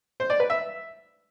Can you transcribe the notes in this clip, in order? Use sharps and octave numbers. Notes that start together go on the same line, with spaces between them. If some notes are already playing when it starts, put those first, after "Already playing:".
C5
D5
B4
E5